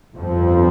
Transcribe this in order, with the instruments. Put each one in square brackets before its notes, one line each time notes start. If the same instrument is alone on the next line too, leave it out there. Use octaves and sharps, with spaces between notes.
[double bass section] G1 F2 F3 C4